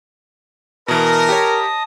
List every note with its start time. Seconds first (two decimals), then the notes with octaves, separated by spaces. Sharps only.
0.88 B2 E3 A#4 D#5 A5 D#6
1.29 G4 C#5